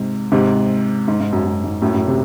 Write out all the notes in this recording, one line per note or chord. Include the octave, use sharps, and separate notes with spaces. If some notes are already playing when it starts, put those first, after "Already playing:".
Already playing: G#2 C3
G#2 C3
G#2
G#2
F#2
F#2
G#2
F#2 A2
F#2 A2
C3